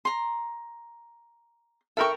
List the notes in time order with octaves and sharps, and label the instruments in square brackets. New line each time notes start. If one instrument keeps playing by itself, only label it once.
[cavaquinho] A#5 C6
[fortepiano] A4 A#4 G5 [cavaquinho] E5 B5 C#6